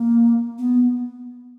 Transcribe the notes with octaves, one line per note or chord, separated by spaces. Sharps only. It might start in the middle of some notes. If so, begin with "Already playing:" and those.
Already playing: A#3
B3